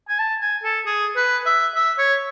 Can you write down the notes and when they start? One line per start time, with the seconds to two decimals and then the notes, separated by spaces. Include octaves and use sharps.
0.09 G#5
0.19 A5
0.41 G#5
0.63 A4
0.86 G#4
1.16 B4
1.46 E5
1.75 E5
1.99 C#5